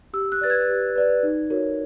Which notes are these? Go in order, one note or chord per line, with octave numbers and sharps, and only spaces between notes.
G4 E6
F#6
B4 D5 A6
G#6
G4
B4 D5
D#4
F#4 A#4 C#5